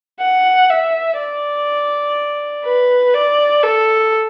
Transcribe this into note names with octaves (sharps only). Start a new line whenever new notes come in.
F#5
E5
D5
B4
D5
A4